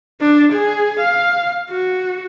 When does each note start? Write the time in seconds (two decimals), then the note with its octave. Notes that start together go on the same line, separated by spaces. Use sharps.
0.21 D4
0.53 G#4
1.00 F5
1.70 F#4